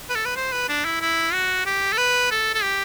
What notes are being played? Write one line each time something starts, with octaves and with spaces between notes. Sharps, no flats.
B4
A4
B4
C5
B4
D4
E4
E4
F#4
G4
A4
B4
A4
A4
G4